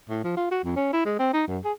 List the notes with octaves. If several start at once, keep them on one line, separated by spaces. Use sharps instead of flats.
A2
F3
F4
F#4
F2
C#4
E4
G#3
C4
D#4
F#2
G#4